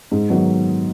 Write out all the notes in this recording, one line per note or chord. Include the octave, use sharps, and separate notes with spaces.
G#2
D#3 F#3 B3